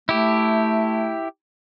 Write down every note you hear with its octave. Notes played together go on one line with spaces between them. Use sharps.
A3 E4 G4